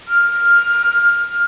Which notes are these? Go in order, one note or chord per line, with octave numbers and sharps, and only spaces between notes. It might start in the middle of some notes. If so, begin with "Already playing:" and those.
F6